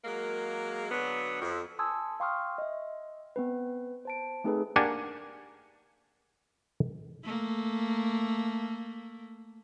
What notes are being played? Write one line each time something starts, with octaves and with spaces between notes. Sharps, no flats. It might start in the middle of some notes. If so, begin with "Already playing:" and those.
F#3 G#3 A#3
D3 F#3 B3 D4
F2
G#5 A5 C6 D#6 E6 G#6
F5 G5 C6 C#6 D#6 F6
D#5 E5
B3 C4 B4
C5 A5 D7
A3 C4 D#4 G#4 A4 B4
A#3 D4 G4 F#5 G#5
A3 A#3